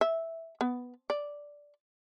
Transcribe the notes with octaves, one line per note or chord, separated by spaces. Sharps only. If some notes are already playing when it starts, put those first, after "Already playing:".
E5
B3
D5